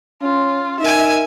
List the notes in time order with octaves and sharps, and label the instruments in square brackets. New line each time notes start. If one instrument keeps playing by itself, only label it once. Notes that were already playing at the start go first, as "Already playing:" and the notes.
[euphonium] C#4 [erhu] F4
[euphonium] D#4 [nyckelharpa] A#4 G#5 [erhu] E5